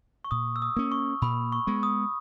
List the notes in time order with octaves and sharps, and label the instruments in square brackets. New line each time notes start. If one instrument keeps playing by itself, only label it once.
[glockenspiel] C#6
[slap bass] A#2 [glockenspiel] D#6
[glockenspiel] E6
D#6
[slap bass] A#3 C#4
[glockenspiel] C#6
[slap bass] A#2 [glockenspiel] B5
[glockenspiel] C#6
[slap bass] G#3 B3
[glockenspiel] D#6